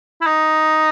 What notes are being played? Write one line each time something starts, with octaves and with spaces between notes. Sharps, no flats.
E4
D#4